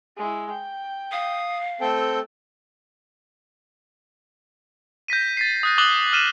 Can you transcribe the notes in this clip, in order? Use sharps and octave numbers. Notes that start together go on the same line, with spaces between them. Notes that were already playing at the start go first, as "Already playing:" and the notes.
G#3 E4
G5
F5 D#6
A3 C4 A4 G5 E6
G6 A#6 B6 D#7
A6 B6 C7
D#6 F#6 A#6
D6 D#6 F#6 G6 F#7 G7
F6 B6 D#7 E7